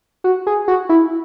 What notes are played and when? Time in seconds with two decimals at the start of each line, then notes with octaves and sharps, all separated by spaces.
0.24 F#4
0.47 G#4
0.68 F#4
0.89 E4